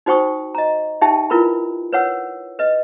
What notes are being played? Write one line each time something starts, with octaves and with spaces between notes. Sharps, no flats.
D#4 F#4 C5 G5 C#6 D#6
D#5 A#5
D#4 G4 E5 G5 A5
E4 F4 A#4 B4 B5
B4 C#5 F#5 E6
B4 D#5